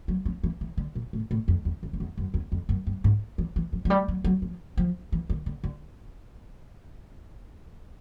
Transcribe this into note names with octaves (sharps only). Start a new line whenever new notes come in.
F#3
F3
E3
E3
D3
A#2
A2
A2
F2
E2
E2
F2
E2
F#2
E2
F2
F#2
G2
G#2
E3
E3
F3
F#3
G3
F#3
F#3
F3
F3
E3
D#3
D3
D3